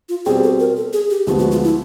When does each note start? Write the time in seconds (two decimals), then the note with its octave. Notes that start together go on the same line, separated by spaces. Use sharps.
0.09 F4
0.26 B2 G3 C4 G#4
0.43 A4
0.60 A#4
0.77 A4
0.93 G#4
1.10 G4
1.27 D2 D3 F3 G#3 B3 G4
1.39 F#4
1.51 F4
1.64 E4